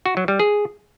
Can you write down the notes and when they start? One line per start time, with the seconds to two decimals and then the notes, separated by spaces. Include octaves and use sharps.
0.06 F#4
0.17 F#3
0.28 G3
0.40 G#4